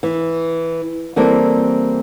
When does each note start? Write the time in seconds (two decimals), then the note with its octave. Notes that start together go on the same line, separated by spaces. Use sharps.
0.03 E3
1.16 E3 G3 A#3 C4 A4